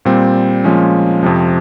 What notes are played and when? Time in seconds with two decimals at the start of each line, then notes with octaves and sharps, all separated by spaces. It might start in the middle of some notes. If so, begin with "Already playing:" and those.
0.05 A#2 G3 C4
0.64 A#2 F3 G#3 C#4
1.23 F2 C3 F3